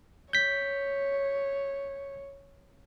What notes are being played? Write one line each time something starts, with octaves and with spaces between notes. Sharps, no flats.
C#5 G6 B6